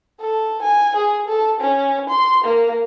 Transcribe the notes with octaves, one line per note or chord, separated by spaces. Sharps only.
A4
G#5
G#4
A4
C#4
C6
A#3